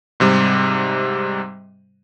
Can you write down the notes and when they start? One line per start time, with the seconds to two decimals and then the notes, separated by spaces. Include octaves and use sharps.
0.20 G#2 C3 G3